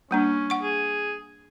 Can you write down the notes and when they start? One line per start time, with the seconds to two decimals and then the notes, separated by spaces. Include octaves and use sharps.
0.11 G3 A#3 C#4 D4
0.50 F#5 C#6
0.63 G#4